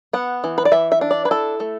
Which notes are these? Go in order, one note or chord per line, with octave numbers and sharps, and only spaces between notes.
B3 F#5
E3
B4
D5
E3 E5
E5
D4
D5
B4
E4 A4
A3